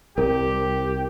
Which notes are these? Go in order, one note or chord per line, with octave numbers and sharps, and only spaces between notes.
C2 G4 A#4